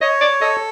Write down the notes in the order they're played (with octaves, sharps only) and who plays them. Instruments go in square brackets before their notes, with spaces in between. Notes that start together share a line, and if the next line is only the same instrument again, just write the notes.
[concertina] C#5 [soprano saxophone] D#5
[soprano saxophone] D5
[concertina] A4 [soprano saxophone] D#5